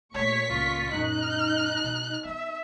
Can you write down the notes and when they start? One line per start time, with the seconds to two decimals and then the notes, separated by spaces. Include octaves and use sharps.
0.14 A#2 A3 C#5 C#6 B6
0.50 C#2 F4
0.94 F#2 A#2 D#4 F#6
1.84 B2
2.25 B3 E5